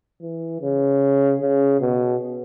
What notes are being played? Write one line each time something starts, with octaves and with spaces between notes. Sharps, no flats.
E3
C#3
C#3
B2